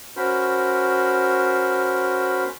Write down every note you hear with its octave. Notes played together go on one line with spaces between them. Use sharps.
C#4 F#4 A#4 C5 B5